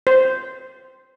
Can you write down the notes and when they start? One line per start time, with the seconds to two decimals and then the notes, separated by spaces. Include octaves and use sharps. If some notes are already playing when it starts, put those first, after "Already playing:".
0.07 C5